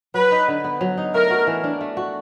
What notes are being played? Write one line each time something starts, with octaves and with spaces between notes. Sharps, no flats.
F#3 B4
D#4
D3
B3
F#3
D#4
A3 A#4
F#4
E3
D4
A3
F#4